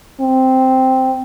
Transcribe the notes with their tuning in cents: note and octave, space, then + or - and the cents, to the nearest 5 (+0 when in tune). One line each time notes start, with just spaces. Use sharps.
C4 -5